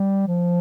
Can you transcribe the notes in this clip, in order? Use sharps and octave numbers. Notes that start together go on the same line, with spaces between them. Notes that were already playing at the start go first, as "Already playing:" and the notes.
Already playing: G3
F3